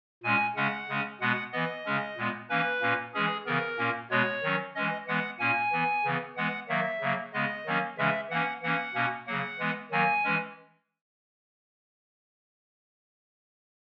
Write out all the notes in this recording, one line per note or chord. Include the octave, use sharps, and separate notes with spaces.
A#2 G#3 C#4 G#5
C#3 G#3 C#4 F#5
C#3 G#3 C#4
B2 G#3 B3 F#5
E3 B3 D#5
C#3 G#3 C#4
A#2 G#3 B3
E3 A#3 C#4 B4
A#2 A#3 C#4
E3 G#3 C#4 G#4
C#3 E3 B3 A#4
A#2 A#3 C#4
B2 G#3 B3 C#5
D#3 F#3 C#4
E3 G#3 C#4 D#5
E3 G#3 B3 F#5
A#2 A#3 C#4 G#5
E3 B3
C#3 E3 B3
E3 G#3 B3 F#5
D#3 F#3 A#3 E5
C#3 F#3 A#3
C#3 G#3 B3 D#5
D#3 F#3 A#3 C#4
C#3 E3 G#3 C#4 E5
E3 A#3 C#4 F#5
E3 A#3 C#4 F#5
B2 A#3 C#4
C#3 F#3 A#3 F#5
E3 G#3 B3
D#3 F#3 A#3 G#5
E3 G#3 C#4